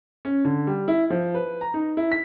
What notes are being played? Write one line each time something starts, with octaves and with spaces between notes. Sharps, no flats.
C#4
D3
G3
E4
F3
B4
A#5
D#4
E4
B6